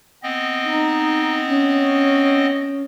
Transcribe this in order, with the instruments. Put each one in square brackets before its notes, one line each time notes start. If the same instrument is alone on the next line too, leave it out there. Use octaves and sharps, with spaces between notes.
[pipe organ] B3 C4 D#5
[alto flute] D#4
C#4